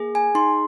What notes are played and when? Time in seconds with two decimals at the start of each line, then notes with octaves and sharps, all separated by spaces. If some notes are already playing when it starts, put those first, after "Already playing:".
Already playing: A#3 G#4
0.15 G#5
0.35 D#4 C6